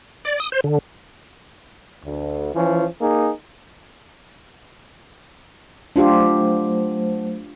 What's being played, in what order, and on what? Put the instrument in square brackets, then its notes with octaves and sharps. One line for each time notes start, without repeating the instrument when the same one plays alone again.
[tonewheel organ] D5
D#6
C5
D3
[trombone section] D2
E3 F3 C#4
A#3 D#4 G#4
[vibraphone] F#3 A3 C5 [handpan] D4 F4 G4